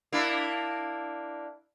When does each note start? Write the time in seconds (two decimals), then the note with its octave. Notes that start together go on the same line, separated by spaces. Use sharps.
0.12 A#3 D4 E4